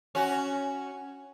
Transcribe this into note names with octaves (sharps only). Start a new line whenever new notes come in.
C#4 F#4